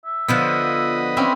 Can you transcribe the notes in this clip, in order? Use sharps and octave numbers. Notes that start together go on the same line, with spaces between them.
E5
D3 F3 B3 B4 D#5
C4 C#4 E4